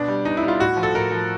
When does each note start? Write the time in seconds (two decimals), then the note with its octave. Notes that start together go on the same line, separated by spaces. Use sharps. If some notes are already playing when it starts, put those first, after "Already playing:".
Already playing: B2 D4
0.08 G3
0.25 B2 D#4
0.37 E4
0.43 G3
0.48 F4
0.60 A2 F#4
0.77 F3
0.83 A4
0.94 A2 A#4
1.11 F3